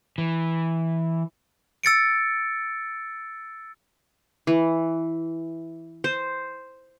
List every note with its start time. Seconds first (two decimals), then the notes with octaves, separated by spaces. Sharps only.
0.18 E3
1.84 E6 A6 C#7 D7
4.47 E3
6.04 C5